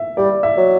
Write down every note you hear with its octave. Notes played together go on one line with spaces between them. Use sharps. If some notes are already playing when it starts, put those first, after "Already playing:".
Already playing: E5
G3 D5
E5
F#3